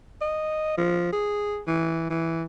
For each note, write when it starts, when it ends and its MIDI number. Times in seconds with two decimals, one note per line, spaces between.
0.21 0.75 75
0.78 1.08 53
1.12 1.61 68
1.67 2.10 52
2.10 2.45 52